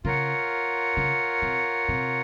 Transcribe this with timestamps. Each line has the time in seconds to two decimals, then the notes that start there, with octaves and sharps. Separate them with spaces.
0.05 C#3 F4 A#4 C#5 F#5
0.97 C#3
1.42 C3
1.89 C3